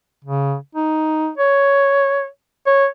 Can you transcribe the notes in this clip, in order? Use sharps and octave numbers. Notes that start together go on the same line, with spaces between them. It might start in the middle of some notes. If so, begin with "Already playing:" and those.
C#3
D#4
C#5
C#5